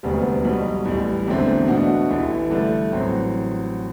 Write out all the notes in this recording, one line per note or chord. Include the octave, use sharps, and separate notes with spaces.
E1 D2 C3 G3 B3
B1 B2 G3
A1 A2 G3
E1 E2 D3 A3 C4
B2 A3 D4 F#4
A1 A2 E3 A3
G2 D3 A3 D4
A1 A2 F#3 C4 F#4